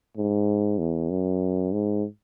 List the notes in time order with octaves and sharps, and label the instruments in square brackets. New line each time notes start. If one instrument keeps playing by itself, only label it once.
[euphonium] G#2
E2
F#2
G#2